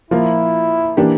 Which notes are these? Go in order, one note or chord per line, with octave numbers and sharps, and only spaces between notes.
F3 A#3 E4 F4
E3 A#3 D4 G4